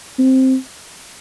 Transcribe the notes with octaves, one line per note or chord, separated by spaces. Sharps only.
C4